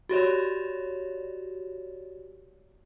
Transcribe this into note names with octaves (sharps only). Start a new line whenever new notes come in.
F#4 G4 C#5 D5